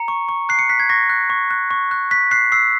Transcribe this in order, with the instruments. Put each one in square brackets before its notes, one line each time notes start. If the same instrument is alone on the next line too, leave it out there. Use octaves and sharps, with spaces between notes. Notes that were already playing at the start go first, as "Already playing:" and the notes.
Already playing: [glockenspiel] A#5 C#7
C#6
C#6
F#6 C7
C#7
F#6 B6
G#6
C#6 A#6
F#6
C#6
F#6
C#6
F#6
F#6 B6
F#6 C7
E6 C7